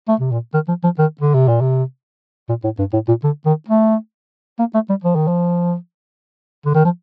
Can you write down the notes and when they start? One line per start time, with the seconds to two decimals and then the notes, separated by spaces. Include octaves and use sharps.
0.08 A3
0.20 C3
0.31 A#2
0.54 D#3
0.68 F3
0.84 F3
0.99 D#3
1.21 D3
1.34 C3
1.48 A#2
1.61 C3
2.49 A#2
2.64 A2
2.79 G2
2.93 A2
3.08 A#2
3.24 D3
3.46 D#3
3.68 A3
4.59 A#3
4.74 A3
4.89 G3
5.04 F3
5.16 D#3
5.28 F3
6.65 D3
6.75 D#3
6.85 F3